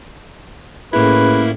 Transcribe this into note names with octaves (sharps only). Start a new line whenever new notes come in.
A2 A#3 C#4 E4 G#4 B4